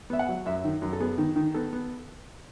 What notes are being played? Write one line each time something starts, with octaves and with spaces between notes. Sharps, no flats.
B3 E5
F#5
F#3
F#2 E5
D#3
F#2
A4
B3 G#4
D#3
D#3
B3 A4
B3